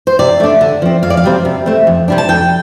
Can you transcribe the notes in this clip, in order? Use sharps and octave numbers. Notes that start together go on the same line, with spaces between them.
C5
C3 D5
A3 D4
D3
F3 C4
F2 F5
D5
F5
C3 G3 C4
C3
A3 C4
F2
C3 G3 D4
A5
F2 G5